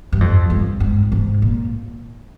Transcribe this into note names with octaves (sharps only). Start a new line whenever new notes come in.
G2
F2
G2
G#2
G#2
A#2